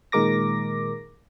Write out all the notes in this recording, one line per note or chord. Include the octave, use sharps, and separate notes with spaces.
A#2 D#3 G#3 A#4 D6 A#6